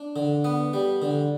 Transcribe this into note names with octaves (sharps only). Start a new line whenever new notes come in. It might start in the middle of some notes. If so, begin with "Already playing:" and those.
Already playing: D4
D3
B3
G3
D3